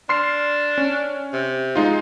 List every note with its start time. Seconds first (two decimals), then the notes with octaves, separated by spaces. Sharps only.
0.09 D4 C6 F6 C7
0.78 C#4
1.33 C3
1.75 G#3 D#4 F4